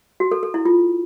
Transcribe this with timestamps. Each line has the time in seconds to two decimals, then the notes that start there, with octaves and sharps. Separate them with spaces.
0.20 F#4
0.31 A4
0.43 A4
0.54 E4
0.65 F4